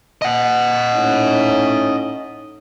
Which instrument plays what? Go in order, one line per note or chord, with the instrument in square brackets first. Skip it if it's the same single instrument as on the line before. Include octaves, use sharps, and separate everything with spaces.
[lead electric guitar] D#5 F#5
[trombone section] A2 C#4 D#4